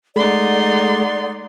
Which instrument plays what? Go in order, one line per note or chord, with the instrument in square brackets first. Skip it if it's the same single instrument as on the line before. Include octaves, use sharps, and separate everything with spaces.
[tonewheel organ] G#3 A3 [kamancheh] D#4 C6 [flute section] D5 F#5